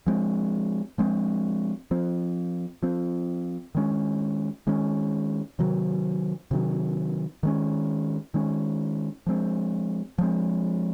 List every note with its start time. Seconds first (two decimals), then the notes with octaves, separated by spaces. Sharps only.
0.07 F3 G#3 C4
0.98 F3 G#3 C4
1.91 F3 C4
2.83 F3 C4
3.75 D#3 G#3 C#4
4.67 D#3 G#3 C#4
5.59 C3 D#3 F#3
6.51 C3 D#3 F#3
7.43 D#3 G#3 C#4
8.34 D#3 G#3 C#4
9.27 F3 G#3 C4
10.18 F3 G#3 C4